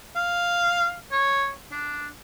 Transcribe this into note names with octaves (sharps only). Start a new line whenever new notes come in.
F5
C#5
D4